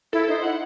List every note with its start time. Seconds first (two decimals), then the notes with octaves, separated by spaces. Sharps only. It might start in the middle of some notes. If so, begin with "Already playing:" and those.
0.13 E4 A4
0.28 D#4 C5
0.42 E4 F#5